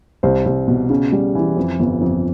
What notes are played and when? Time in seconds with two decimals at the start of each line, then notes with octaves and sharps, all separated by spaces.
0.23 C2 C5
0.46 C2
0.68 B2
0.90 C#3
1.12 G3
1.35 E3
1.56 F2
1.79 G1
2.01 F2